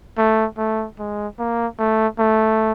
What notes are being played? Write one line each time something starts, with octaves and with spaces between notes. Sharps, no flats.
A3
A3
G#3
A#3
A3
A3